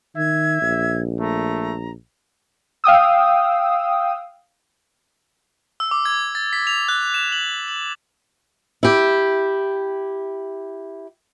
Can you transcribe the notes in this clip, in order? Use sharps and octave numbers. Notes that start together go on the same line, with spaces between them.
D#3 E5 G#6
A#1
A3 A#5
F5 G5 D#6 E6
E6
D6
G#6
A6
B6
F7
F#6
E7
F#7
F#7
E4 G4